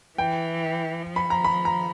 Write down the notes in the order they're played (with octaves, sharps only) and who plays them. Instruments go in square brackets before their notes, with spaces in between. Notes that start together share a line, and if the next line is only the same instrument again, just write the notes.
[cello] E3 [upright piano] G5
[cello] F3
[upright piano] B5
A#5
B5
A#5